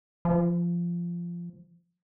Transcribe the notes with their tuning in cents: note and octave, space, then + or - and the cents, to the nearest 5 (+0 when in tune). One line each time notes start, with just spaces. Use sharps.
F3 -15